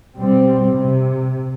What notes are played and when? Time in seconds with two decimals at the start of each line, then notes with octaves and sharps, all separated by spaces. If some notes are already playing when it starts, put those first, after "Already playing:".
0.17 B2 G3 C4
0.73 C3